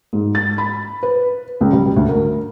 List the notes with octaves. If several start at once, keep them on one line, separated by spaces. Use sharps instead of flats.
G#2
A6
B5
B4
C#2
G3
D2
A#4